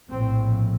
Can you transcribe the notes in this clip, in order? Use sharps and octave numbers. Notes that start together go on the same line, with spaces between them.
A#1 A2 C4